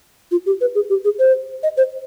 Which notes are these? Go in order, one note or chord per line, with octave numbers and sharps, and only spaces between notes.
F4
G4
B4
G#4
G4
G#4
C5
D#5
C5